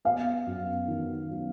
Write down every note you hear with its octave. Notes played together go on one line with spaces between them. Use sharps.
B3 F5
F#2
D#3
F#3